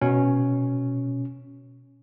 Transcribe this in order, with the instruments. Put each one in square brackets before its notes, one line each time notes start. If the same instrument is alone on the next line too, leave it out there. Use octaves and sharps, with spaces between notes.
[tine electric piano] B2 C#4